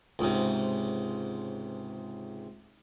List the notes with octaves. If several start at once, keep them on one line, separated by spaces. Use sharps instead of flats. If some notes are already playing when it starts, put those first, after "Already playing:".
C#2 G#2 C3